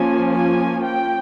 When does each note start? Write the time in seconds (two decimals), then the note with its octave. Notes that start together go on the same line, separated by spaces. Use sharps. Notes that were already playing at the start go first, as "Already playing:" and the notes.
Already playing: F3 A#3 C#4 G#5
0.32 G#5
0.84 G5